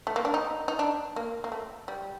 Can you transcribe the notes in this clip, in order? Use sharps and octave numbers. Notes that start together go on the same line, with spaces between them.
A3
A#3
D4
D#4
D#4
D4
A#3
A#3
A3
G3